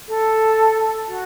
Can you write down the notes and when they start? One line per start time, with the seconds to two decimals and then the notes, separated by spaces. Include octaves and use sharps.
0.08 A4
1.08 F#4